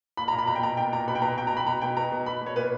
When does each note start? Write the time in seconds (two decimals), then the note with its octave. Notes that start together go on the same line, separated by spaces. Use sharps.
0.17 A#2 B5
0.28 A#5
0.32 A#2
0.38 B5
0.47 B2 A#5
0.55 G5
0.62 B2 A#5
0.77 A#2 G5
0.92 A#2 A#5
1.07 B2 B5
1.15 G5
1.22 B2 A#5
1.37 B2 G5
1.47 A#5
1.52 B2 B5
1.67 B2 A#5
1.82 B2 G5
1.97 B2 A#5
2.12 B2
2.26 B2 B5
2.41 B2
2.46 C#5
2.56 A#2 B4